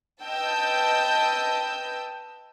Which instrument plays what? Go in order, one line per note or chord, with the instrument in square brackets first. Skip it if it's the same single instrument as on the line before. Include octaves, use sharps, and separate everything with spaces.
[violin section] B4 D#5 G5 A5 E6 G6